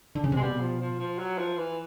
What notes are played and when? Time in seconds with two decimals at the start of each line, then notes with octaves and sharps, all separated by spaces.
0.15 D3
0.24 C#3
0.32 C3
0.36 G#3
0.41 B2 G3
0.60 F3
0.80 F3
0.99 F3
1.18 F#3
1.38 F3
1.57 E3